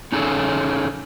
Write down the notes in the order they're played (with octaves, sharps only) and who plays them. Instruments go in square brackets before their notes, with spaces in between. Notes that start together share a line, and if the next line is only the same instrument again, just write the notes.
[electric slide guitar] C#4 D#4 G#4 A4 C#5